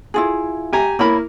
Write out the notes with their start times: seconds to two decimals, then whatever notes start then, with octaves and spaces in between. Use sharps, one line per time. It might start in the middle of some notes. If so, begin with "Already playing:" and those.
0.14 E4 F4 G#4
0.73 G4 G#5 A#5
0.99 A#3 E4 A#4 C#5 B5